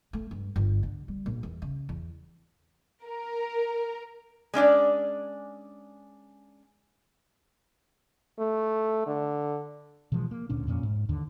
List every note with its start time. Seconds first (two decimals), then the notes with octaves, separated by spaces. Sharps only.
0.13 A3
0.31 G2
0.56 G1
0.83 D3
1.08 G3
1.26 A#1
1.43 E2
1.62 C#3
1.89 E2
3.06 A#4
4.54 G#3 C#4 D4 D5
8.39 A3
9.07 D3
10.12 B2 E3 F3 G#3
10.31 A#3
10.49 D2 A#2 C#4 D4
10.67 F2 A#2 A#3 C#4
10.83 G#2
11.09 D#2 D3